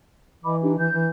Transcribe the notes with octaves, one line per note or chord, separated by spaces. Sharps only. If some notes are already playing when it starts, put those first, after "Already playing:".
E3 D#5 B5 D6
D4 D#4 G4
E3 G6
E3